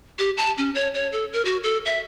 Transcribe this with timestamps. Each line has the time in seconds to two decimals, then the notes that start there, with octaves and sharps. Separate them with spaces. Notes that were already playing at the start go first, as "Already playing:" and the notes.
0.19 G4
0.37 A5
0.58 C#4
0.75 C#5
0.94 C#5
1.12 A4
1.33 A#4
1.45 F#4
1.63 A4
1.85 E5